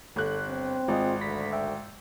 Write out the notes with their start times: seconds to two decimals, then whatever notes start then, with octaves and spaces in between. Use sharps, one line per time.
0.16 G1 A4 F#6
0.48 C4
0.88 G#1 F4 G#4 D#5
1.21 D2 B5 A#6 B6
1.53 E5 G5